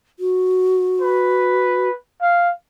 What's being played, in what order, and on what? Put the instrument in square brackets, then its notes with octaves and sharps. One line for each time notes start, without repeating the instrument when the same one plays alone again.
[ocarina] F#4
[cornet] B4
F5